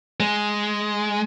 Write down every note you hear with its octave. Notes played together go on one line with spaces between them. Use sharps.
G#3